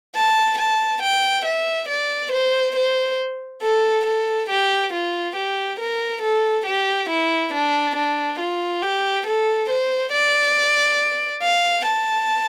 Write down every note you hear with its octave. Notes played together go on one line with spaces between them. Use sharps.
A5
A5
G5
E5
D5
C5
C5
A4
A4
G4
F4
G4
A#4
A4
G4
E4
D4
D4
F4
G4
A4
C5
D5
F5
A5